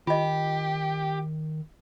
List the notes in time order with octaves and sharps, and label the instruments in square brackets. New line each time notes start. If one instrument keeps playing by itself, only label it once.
[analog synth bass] D#3 [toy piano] F4 D#5 [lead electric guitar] G4